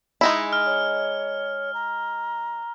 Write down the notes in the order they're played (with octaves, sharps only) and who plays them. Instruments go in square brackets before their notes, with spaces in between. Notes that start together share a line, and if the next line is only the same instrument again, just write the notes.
[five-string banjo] G#3 D#4 E4
[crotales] F6
[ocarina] C#5
A#5